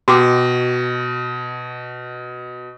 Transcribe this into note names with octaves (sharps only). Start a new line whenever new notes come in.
B2 F#4 G5 D6